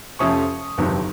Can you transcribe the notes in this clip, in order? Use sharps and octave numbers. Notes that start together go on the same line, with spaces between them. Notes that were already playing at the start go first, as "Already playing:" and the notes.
F2 C3 F3 A3 C#4 C#6 D#6
G1 F2 C3 D#3 F#3